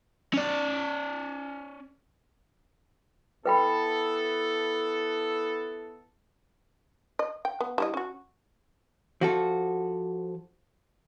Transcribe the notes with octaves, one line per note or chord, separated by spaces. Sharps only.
C#4 D5
B3 E4 A4 B4 G5 B5
D#5
G5
B3
G3 E4 D#5
C#4 F#4
F3 F#4 A4